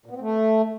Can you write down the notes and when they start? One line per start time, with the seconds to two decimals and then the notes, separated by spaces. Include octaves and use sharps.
0.06 A#2
0.11 B3
0.16 C4
0.22 A3